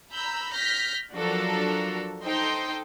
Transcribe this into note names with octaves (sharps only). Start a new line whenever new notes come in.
A#5 B5 E6 G6
F6 G6 A#6 B6
F3 F#3 D4 F#4 A4 A#4
D#4 A4 C5 G5 C6